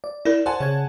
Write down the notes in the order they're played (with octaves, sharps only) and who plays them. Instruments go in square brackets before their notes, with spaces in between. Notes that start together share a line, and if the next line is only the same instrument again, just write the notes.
[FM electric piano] D5
[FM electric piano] E4 [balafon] A#4 D5
[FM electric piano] C5 [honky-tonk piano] F#5 G#5 A5
[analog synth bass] C#3 [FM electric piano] C#5 G#6